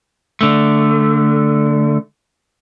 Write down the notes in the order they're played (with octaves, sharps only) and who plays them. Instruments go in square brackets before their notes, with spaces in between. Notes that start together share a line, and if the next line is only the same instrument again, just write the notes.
[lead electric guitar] D3 A3